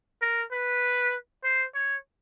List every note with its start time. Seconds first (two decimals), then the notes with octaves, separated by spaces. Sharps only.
0.22 A#4
0.52 B4
1.44 C5
1.74 C#5